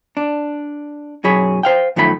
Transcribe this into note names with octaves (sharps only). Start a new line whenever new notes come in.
D4
B1 F#2 F#3 G#4 C#5 B5
C5 F5 G5
F#2 D#3 F3 A3 E5 B5